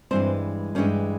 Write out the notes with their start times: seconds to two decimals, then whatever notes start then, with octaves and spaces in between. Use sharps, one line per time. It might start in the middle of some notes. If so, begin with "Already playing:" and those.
0.11 G2 E3 G#3 C4 C5
0.75 G2 E3 G#3 C#4 C#5